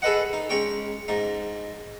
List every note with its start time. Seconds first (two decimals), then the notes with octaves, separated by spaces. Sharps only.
0.02 G#4 A4 B4 D#5 F#5
0.33 D#4
0.49 G#3 C#4 C#5 G5
1.08 G#2 D#4